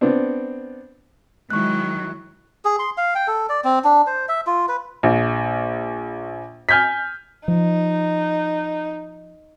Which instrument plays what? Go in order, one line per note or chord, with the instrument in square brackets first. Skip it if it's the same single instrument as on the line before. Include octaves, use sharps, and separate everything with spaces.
[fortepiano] B3 C4 D4
[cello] D#3 F#3 [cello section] G#3 E4 [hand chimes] C#6 F#6
[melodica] G#4
C6
F5
G5
A4
D5
C4
D4
C5
E5
F4
B4
[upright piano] A#1
G#5 F6 G6 G#6 B6
[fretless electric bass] F3 [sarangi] D#4